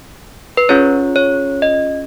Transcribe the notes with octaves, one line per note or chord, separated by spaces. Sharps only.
B4
C#4 F4 G#4 C#5
C#5
D#5